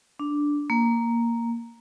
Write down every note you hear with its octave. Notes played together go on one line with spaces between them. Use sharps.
D4
A#3